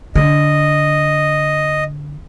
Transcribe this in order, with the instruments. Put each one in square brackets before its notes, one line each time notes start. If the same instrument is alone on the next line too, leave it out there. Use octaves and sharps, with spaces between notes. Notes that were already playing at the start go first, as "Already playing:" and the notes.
[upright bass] D3 [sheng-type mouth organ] D#5